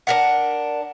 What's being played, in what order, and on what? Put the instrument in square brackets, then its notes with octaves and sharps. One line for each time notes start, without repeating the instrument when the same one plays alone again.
[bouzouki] D4 A#4 F#5